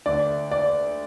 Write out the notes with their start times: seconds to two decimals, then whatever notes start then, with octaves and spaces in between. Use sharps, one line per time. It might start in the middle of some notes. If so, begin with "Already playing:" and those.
0.06 D2 D5
0.51 D5